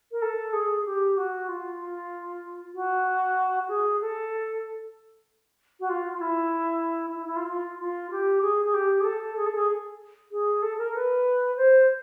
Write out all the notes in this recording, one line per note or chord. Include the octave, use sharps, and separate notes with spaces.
A#4
A4
G#4
G4
F#4
F4
F#4
G#4
A4
F#4
F4
F4
E4
E4
E4
F4
F4
F4
G4
G#4
G#4
G4
G#4
A4
G#4
A4
G#4
G#4
A4
A#4
B4
C5